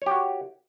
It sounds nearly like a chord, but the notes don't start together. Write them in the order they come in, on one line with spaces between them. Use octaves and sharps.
C#5 G4 F#4